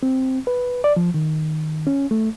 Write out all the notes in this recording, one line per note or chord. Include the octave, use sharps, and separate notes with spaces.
C4
B4
D5
F3
D#3
C#4
A3